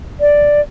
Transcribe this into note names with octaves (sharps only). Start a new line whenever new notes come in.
D5